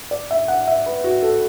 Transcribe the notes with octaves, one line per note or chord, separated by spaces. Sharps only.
D5
E5
F#5
E5
B4
F#4
A4